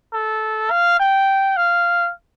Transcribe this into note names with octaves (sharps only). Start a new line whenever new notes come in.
A4
F5
G5
F5